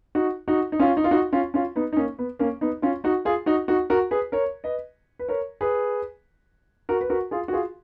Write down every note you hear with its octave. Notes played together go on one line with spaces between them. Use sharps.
D#4 F#4
D#4 F#4
D#4
C#4 F4
D#4
F4
D#4 F#4
C#4 F4
C#4 F4
B3 D#4
D#4
A#3 C#4
B3
A#3 C#4
B3 D#4
C#4 F4
D#4 F#4
F4 G#4
D#4 F#4
D#4 F#4
F#4 A#4
G#4 B4
A#4 C#5
B4 D#5
B4
A#4 C#5
G#4 B4
F#4 A#4
B4
F#4 A#4
F4 G#4
F#4
F4 G#4